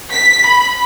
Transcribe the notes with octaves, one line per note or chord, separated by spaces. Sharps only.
B6
B5